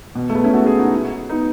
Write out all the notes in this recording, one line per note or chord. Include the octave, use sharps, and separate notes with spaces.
B2
A3
G#3 B3
C#4 E4
F#4 A4
E4 G#4
D#4 F#4
B3 D#4